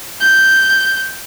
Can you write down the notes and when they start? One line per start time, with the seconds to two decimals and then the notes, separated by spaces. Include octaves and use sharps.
0.20 G6